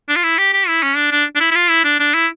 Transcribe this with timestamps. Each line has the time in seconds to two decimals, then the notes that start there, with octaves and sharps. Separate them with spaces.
0.09 D4
0.16 F4
0.23 E4
0.38 G4
0.53 G4
0.68 E4
0.83 C#4
0.96 D4
1.11 D4
1.36 D4
1.40 E4
1.51 E4
1.55 F4
1.69 E4
1.84 D4
2.00 D4
2.14 E4